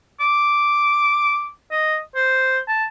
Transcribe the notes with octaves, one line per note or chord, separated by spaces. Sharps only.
D6
D#5
C5
A5